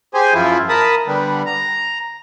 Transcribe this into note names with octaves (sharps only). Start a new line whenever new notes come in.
G4 G#4 C5 G#5
F#2 F3 E4 F4
A#4 A5 B5 D#6
D3 G3 B3
A#5